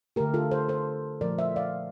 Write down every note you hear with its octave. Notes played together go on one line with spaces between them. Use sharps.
D3 A3 G4 A#4
F4 A4
A4 C5
A4 C5
A#2 F3 A3 A#4 D5
C5 E5
D5 F5